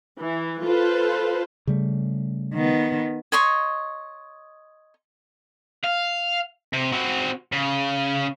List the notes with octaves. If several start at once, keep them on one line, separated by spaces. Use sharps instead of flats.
E3
F4 A4 B4 C5
C#3 G3 A3
D#3 B3
C#5 D#5 C6 C#6
F5
C3
C4 F#4
C#3